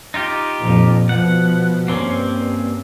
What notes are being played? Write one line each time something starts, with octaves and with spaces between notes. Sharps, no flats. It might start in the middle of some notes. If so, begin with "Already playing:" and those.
D#4 F4 G4
F2 A#2
B2 F3 F#5
G2 A#3 C4 C#4